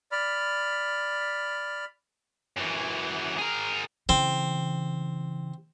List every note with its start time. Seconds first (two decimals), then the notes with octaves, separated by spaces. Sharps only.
0.12 D5 B5 F6
2.57 F#2 E3
3.38 G#4 A#4
4.09 C#3 E3 C4